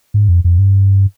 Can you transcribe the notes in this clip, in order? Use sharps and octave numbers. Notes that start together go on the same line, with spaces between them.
G#2
F2
F2
G2